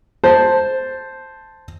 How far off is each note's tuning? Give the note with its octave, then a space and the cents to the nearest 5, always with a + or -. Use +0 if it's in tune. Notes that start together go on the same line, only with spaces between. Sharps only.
C5 +0 A5 +0